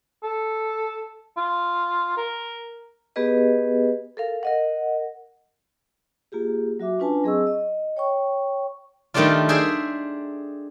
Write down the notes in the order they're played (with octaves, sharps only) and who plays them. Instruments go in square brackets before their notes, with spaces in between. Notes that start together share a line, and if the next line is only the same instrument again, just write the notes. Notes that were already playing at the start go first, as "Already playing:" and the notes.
[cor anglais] A4
F4
A#4
[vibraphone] B3 G4 G#4 B4 D#5
A4 A#4 F5
A#4 D#5 F#5
A#3 F4 G4 G#4
F#3 F#4 E5 D6
C#4 D4 F4 B4 G#5 A5
F#3 C4 G#4 D#5 C#6 E6
D#5
C#5 G5 C#6
[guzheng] D#3 G3 A3 C4 D4 F4
G#4 C5 D5 E5 G#5